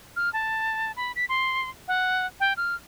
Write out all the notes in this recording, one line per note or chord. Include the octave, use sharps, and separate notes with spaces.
F6
A5
B5
B6
C6
F#5
G5
F6